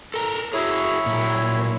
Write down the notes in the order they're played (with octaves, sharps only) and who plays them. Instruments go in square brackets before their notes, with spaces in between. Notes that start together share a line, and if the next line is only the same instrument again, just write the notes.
[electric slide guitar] A4 A#4 A#5
[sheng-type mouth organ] E4 C#5 [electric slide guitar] F#4 G#4
[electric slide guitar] A#2 F#3